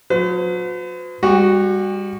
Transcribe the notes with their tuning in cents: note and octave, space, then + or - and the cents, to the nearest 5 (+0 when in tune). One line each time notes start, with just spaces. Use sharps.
F#3 -40 B4 +45
G3 +30 F#4 +5